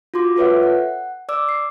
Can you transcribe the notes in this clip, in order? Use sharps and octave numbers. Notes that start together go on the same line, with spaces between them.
F4 F#4 C6 D6
F4 A4 B4 C#5 E5 F#5
F#5
D5 D6 E6
C7